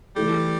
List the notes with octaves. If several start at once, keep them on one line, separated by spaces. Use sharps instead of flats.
E3 G3 A3 E4 A4